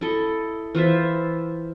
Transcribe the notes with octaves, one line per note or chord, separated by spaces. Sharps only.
E4 A4 D#5
E3 F4 C5 E5